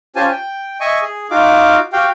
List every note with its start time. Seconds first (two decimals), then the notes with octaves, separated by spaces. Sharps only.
0.16 C#4 F4 G4 C5 G#5 A5
0.31 G5
0.80 D#5 E5 G#5 C#6 D#6
1.02 G#4
1.31 D#4 F4 F#4 F5 D6
1.93 F#4 G4 F5 G5